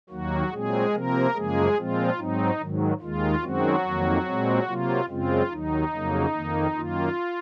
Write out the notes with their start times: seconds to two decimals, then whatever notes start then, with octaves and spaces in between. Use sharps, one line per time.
0.10 D#2 D#3 F#3 A#3 F#4
0.51 A#2 F#3 G#3 C4 G#4
0.93 C3 F3 A#3 C4 A#4
1.34 F#2 C#3 F3 G#3 A#3 G#4
1.76 A#2 F3 G#3 C4 F4
2.18 G#2 F#3 C4 D#4
2.60 G#2 D#3 F#3
3.01 D#2 D#3 G#3 F4
3.42 F#2 D#3 F#3 G#3 C4 F#4
3.85 F2 D#3 A#3
4.26 A#2 G#3 C4
4.67 C3 F#3 A#3 F4
5.09 F#2 C#3 G#3 C4 F4
5.50 D#2 D#3 F#3 D#4
5.93 F2 C#3 F#3 A#3
6.33 F2 D#3 A#3
6.75 F#2 D#3 A#3 F4